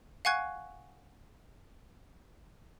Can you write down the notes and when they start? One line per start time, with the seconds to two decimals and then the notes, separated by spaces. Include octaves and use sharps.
0.25 F5 F#5 G#5 C#6 F#6 G#6